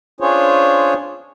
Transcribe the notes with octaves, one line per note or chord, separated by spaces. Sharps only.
C#4 D4 F4 G#4 C5 C#5